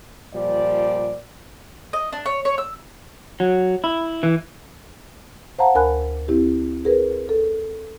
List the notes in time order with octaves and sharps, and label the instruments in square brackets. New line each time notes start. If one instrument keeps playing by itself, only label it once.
[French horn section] A#2 F3 G3 D5
[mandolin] D#5
D4
C#5
C#5
E6
[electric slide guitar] F#3
E4
E3
[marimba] C5 F5 F#5 A5 A#5
D2 A#4 G#5 B5 F#6
C4 E4 G4
G#4 A#4 B4
A4